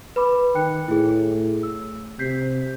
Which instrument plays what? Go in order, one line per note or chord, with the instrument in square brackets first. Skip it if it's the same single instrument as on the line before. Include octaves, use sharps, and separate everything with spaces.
[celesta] B4 B5 D6
[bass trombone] D#3 [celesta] G5 F#6 C#7
[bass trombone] A2 [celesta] E4 G#4
[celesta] E6
[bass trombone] C3 [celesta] G6 B6 C7